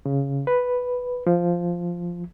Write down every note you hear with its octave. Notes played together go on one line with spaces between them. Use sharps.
C#3
B4
F3